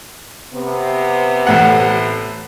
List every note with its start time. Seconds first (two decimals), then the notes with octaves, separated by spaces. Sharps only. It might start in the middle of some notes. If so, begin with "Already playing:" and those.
0.54 C3 B3
1.47 A1 A2 F#5